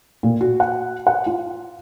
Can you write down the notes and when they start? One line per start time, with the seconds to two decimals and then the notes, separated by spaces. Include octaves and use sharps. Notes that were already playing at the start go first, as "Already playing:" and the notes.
0.23 A#2
0.41 F#4
0.60 F#5
1.07 F#5
1.26 F4